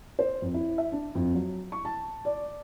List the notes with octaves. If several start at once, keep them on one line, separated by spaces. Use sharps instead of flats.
C5
F2
E4
E5
D4
F2
F#3
C#6
A5
D5